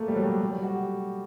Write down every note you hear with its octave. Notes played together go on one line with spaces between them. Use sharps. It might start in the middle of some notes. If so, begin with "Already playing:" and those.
Already playing: A3 A#3
G3
F#3
G3
F#3
G3
F#4
G4